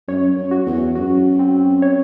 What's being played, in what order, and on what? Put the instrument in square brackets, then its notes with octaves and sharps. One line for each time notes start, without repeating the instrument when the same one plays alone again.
[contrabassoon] F#2 [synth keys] C#5
[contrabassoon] F#2
[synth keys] F#4
[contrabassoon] E2
[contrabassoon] F#2 [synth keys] F#4
[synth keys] C4
C#5